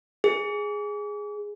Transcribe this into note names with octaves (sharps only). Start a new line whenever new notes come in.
G#4